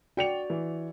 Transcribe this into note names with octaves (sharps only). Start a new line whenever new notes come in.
F#4 D5 G5 C#7 F7
E3